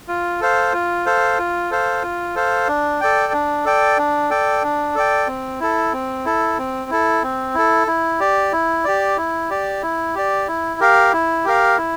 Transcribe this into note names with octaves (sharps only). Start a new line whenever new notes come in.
F4
A4 C5 F5
F4
A4 C5 F5
F4
A4 C5 F5
F4
A4 C5 F5
D4
A4 D5 G5
D4
A4 D5 G5
D4
A4 D5 G5
D4
A4 D5 G5
C4
E4 A4
C4
E4 A4
C4
E4 A4
C4
E4 A4
E4
G4 D5
E4
G4 D5
E4
G4 D5
E4
G4 D5
E4
G4 A#4 F5
E4
G4 A#4 F5
E4